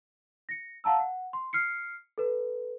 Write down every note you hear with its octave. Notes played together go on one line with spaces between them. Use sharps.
A#6 C#7
F5 F#5 A5 A#5 E6
F#5
C6
F6 C7 C#7
A4 B4